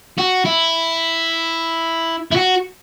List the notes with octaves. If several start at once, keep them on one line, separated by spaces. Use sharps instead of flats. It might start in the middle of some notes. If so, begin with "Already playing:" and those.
F#4
E4
E4
F#4